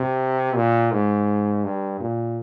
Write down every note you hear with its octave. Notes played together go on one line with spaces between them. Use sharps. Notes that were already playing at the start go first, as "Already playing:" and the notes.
Already playing: C3
A#2
G#2
G2
A#2